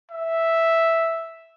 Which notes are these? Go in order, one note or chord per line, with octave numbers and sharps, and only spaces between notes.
E5